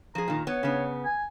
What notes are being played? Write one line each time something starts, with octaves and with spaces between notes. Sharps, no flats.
F3 G#4 A#5
A#2 D#3
B3 C#5
C#3 B3
G#5